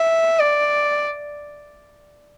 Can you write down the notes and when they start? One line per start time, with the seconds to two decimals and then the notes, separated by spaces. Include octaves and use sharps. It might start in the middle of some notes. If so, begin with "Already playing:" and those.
Already playing: E5
0.40 D5